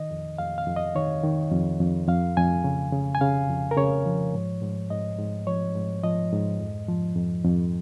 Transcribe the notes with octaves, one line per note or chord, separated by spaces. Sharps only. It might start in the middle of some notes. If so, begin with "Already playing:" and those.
Already playing: D#3 D#5
F2
F2 F5
F5
F2
D#5
D#3 C#5
D#3
F2
F2
F2 F5
F2 G#5
C#3
C#3
G#5
C#3 F5
F2
A#4
C#3 C#5
F3
G#2
G#2
G#2 D#5
G#2
F3 C#5
G#2
F3 D#5
G#2
F2
F3
F2
F2